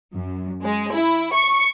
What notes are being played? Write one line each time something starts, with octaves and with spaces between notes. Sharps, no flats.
F#2
G#3
E4
C#6